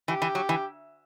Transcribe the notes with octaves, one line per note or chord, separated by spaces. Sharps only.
E3 G4
E3
F#3
E3